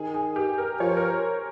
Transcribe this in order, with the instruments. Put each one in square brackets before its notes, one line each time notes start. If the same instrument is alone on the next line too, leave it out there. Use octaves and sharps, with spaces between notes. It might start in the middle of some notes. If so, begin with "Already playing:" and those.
Already playing: [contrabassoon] D#3 [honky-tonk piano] G#4
[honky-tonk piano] G#4
G4
A#4
[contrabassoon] F3 [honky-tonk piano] C#5
[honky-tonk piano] C5
A#4